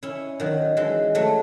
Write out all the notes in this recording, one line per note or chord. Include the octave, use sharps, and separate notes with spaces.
C#4 E4
D#3 F#3
E3 G#3
F#3 A3